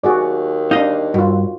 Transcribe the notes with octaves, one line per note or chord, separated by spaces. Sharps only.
D#2 F#4 G#4 D5
D4 D#4 D#5 F5
G2 F4 F#4